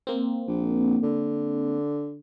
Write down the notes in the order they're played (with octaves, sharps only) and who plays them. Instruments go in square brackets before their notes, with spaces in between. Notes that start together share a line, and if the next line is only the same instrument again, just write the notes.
[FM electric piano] A#3 C4
[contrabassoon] A#1
D3